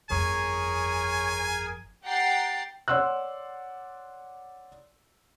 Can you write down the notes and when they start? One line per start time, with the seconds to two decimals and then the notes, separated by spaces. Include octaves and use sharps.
0.10 G1 F2 G#4 A#4 C#5 G#5
2.03 G4 F#5 G5 A#5 A6 C7
2.88 C#5 D5 F#5 C6 E6 F#6